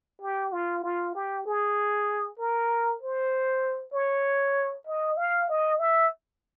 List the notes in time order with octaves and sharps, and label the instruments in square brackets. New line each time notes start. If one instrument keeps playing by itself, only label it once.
[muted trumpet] G4
F4
F4
G4
G#4
A#4
C5
C#5
D#5
F5
D#5
E5